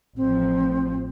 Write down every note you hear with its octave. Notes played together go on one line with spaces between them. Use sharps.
A1 F3 C4